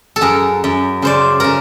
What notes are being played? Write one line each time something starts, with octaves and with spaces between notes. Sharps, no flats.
A4
F#2 G#4 A#4
F#2
C#3 C5 D5
C#3 A#4